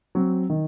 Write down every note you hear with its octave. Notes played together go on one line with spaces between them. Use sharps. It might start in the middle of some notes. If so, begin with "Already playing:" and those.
F#3 C4
D#3